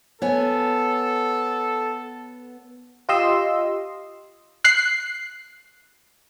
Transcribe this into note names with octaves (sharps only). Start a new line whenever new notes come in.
B3 A4 C#5 G#5
F4 G4 D#5 C6 E6
F#6 C7